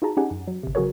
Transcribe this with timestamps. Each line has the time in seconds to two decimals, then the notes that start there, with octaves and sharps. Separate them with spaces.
0.02 D#4 F4 F#4 G#4 A5 A#5
0.17 C#4 D#4 G4 G#4 F#5 G#5
0.31 F#2
0.48 F#3
0.63 G1 C3
0.75 C#3 F#3 F#4 G#4 A#4 C#5